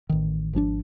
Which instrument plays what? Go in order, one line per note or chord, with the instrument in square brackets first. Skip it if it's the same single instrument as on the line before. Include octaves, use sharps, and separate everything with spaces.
[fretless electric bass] A1 D#3
G#1 F3 C#4 D4